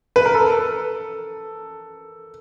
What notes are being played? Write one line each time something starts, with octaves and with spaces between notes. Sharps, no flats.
B4
A#4
A4